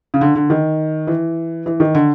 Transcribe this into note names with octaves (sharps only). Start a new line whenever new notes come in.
C#3
D3
D3
D#3
E3
E3
D#3
D3